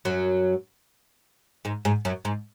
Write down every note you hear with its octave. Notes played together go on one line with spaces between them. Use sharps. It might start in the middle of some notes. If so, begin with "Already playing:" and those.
F#2 F#3
G#2 G#3
G#2 G#3
F#2 F#3
G#2 G#3